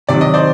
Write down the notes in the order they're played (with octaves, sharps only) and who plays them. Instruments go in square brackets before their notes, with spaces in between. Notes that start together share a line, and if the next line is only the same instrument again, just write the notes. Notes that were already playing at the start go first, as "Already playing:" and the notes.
[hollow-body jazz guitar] C3 D#3 F#3 [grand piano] D5
[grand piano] D#5
C5 D5